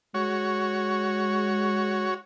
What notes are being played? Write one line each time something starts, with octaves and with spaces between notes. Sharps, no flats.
G#3 F#4 C#5